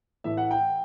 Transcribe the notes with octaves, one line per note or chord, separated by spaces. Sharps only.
A2 E3 A3 E5
F#5
G5